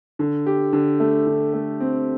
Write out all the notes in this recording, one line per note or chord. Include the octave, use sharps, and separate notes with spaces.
D3
G4
D3
A3
D3
A3
C4